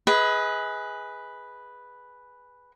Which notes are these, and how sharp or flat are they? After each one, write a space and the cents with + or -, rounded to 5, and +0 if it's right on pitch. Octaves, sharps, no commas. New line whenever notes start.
G#4 +0 B4 +0 D#5 +40